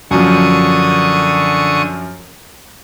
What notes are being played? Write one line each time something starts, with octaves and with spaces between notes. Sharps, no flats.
F#2 D3 F3 C#6 D#6